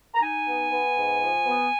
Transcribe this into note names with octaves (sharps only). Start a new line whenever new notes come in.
A#5
D#4 G#5
B3
B3
G#2
F3
B3